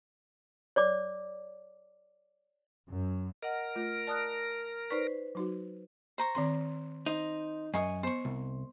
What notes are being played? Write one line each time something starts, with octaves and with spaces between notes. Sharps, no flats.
C#5 D5 D6
F#2
A#4 D#5 F#5
A3 F4
D5 A5 D#6 F#6
D#4 B4 C5 D5 C#6
F#3 D#4 F#4
C5 A#5 C#6
D#3 C4 C6
D#4 C5
F#2 D#5 G#5 C#6 D#6
B3 C5 C#6
C2